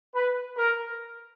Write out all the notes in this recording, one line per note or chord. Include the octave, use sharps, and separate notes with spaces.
B4
A#4